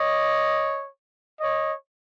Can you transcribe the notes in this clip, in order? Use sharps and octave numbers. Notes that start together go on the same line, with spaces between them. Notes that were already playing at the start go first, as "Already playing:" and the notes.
Already playing: C#5 D#5
C#5 D#5